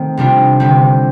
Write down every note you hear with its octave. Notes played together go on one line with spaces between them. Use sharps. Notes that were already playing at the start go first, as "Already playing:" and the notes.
Already playing: D#3 A3 C4
C3 G3 D4 F4
D3 G3 C4